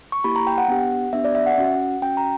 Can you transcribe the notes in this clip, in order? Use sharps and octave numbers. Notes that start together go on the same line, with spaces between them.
C#6
A#3 E4 G4 B5
A#5
G5
F#5
B3 D4 G4
B3 D4 G4 E5
D5
E5
F#5
C#4 F#4
C#4 F#4 G5
A#5